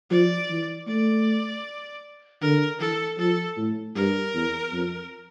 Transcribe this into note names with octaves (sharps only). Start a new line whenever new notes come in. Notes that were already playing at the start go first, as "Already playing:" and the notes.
F3 D5
E3
A3 D5
D3 A#4
E3 A4
F3 A4
A2
G2 A#4
E2
F2